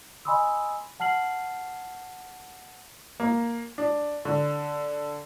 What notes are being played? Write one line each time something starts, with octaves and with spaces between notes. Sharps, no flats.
D#5 G#5 B5 C6 D#6 E6
F#5 A5 F6 C7 F#7
A#3
D4
D3